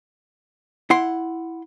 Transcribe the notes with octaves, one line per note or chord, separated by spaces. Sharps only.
E4 F#5 C6